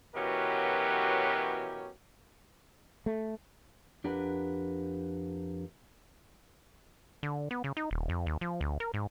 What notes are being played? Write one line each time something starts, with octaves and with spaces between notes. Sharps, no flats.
B2 E3 F#3 C#4 G4 A#4
A3
F2 D4 G4 A#4 B4 F#5
D3
B3
C#3
D#4
D#1
F2
D#2
F3
D2
A#4
G#2